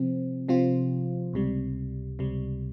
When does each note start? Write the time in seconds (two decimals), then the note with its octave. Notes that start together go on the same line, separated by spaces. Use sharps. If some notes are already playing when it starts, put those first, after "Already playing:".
Already playing: C3 F3 C4
0.48 C3 F3 C4 F4
1.33 C#2 C3 G3
2.19 C#2 C3 G3